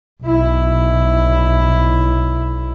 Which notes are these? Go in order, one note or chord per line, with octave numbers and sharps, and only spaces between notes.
B1 E4